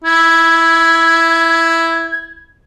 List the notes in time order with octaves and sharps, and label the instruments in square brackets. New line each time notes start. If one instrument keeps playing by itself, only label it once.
[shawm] E4 [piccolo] G#6